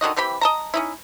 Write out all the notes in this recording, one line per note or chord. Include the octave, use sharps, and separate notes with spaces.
D3 D#3 F#4 D#5
E3 C4 G4 B5
D#5 A5 A#5
C#4 D#4 E4